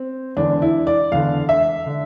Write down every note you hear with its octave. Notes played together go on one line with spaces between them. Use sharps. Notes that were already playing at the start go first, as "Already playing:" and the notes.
Already playing: C4
E2 D3 D4
E4
D5
E2 D3 F5
E5
D3